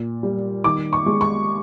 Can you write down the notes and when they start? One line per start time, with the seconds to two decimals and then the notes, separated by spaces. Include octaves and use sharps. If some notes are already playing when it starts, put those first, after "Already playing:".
Already playing: A#2
0.23 G3
0.64 D#3 D6
0.93 C#6
1.06 G#3
1.21 C#6